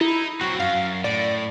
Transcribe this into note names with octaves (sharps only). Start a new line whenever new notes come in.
D#4 E4
F#3 C4 F#4
F#2 F5
A2 D5